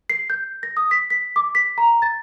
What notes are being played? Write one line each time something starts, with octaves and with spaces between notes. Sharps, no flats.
C7
G6
A#6
D#6
B6
B6
D6
B6
A#5
A6